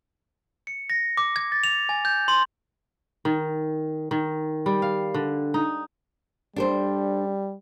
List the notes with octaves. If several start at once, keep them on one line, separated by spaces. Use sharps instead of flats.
C#7
A#6
D6
G#6
A6
F7
G#5
G6
C6
D#3
D#3
G3
F5
D3
D#4
G3 D4 A4 C5